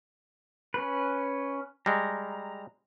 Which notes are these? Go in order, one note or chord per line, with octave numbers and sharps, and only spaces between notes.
C#4 B4
G3 G#3 A#5